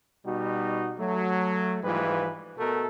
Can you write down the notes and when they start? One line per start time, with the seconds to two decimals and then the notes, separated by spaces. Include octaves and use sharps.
0.25 B2 G3 D#4 F#4
0.98 F#3 A3
1.83 G#2 E3 F3 G3 F4 B4
2.58 B2 A3 A#4